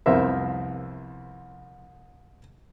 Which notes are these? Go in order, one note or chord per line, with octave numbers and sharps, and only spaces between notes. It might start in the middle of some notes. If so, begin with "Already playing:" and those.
C2 F2 B3 A#4 C5 E5